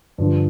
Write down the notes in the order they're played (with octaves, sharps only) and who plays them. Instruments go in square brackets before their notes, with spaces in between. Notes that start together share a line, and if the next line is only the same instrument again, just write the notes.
[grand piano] G2 D3 F3